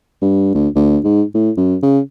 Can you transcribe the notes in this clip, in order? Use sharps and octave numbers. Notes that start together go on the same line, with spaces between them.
G2
D2
D2
G#2
A2
F#2
C#3